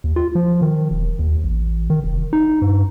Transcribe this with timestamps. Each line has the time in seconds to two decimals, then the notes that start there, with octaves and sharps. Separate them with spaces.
0.04 D#2
0.16 F4
0.35 F3
0.61 D#3
0.91 E1
1.19 D#2
1.44 A1
1.90 D#3
2.04 F1
2.33 D#4
2.62 G2